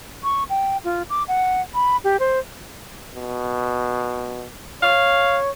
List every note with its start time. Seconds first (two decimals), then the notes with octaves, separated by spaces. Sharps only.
0.24 C#6
0.50 G5
0.84 F4
1.10 D6
1.28 F#5
1.74 B5
2.04 G4
2.20 C5
3.14 B2
4.83 C#5 F5